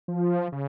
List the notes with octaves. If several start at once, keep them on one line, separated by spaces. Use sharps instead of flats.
F3
C#3